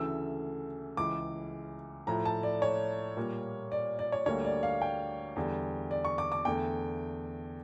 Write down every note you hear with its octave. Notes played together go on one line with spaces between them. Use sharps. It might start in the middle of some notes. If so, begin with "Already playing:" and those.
Already playing: D2 C#3 E3 A3 E6
C#2 C#3 E3 D6
A2 F3 A3 A#5
A5
D5
C#5
A#2 G3 A#3
D5
D5
C#5
D2 D3 G3 A#3 C#5
D5
F5
G5
E2 D3 G3
D5
C#6
D6
D6
E2 D3 A3 G5